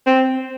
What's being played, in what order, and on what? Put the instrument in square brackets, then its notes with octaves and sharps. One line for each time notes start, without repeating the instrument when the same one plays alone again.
[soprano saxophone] C4